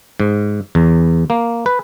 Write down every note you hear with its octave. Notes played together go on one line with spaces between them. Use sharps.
G#2
E2
A#3
B4